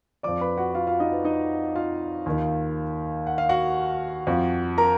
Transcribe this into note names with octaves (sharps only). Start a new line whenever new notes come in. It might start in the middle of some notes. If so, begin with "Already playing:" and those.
F2 F3 D5 D6
B4 B5
F#4 F#5
F4 F5
F4 F5
D#4 D#5
B4
D#4 D#5
F4 F5
D#2 D#3
F#5
F5
F#4 F#5
F2 F3
A#4 A#5